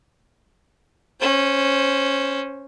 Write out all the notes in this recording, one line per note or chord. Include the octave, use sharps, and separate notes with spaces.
C#4 C5